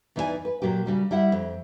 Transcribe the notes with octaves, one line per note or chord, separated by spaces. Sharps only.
E2 E3 D#4 E4 D5 G#5
B4
A#2 F#3 F#4 G4
C#3 G3 F#4
G3 E4 E5 F#5
F2